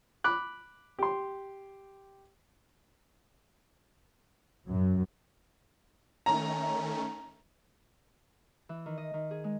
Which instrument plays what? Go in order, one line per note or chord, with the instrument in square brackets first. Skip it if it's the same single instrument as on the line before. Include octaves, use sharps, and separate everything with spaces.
[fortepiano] B5 D6 F#6
G4 C6
[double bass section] F#2
[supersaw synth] D#3 A3 C#4 [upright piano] A#5
[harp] E3
D#3
D#5
D#3
G#4
G#3